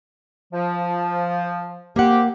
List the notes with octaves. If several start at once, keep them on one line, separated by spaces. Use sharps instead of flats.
F3
A#3 C4 G4 F#5